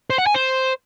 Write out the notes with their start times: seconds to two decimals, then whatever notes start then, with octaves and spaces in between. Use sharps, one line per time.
0.10 C5
0.18 F#5
0.26 G#5
0.34 C5